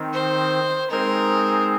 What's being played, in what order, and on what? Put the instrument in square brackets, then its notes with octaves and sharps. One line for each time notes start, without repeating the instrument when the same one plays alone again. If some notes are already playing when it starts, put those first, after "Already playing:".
Already playing: [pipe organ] D#3 C4 D#4
[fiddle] C5
[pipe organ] G#3 C4 D#4 G#4 C5 [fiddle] A#4